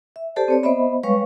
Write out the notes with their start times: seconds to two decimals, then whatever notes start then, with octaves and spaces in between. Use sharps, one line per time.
0.16 E5
0.36 G4 A4 C5 D5 A5
0.48 C4 C#5 D5
0.63 B3 C5 D#5 E5 B5
1.03 G3 G#3 B4 C#5 F5 C#6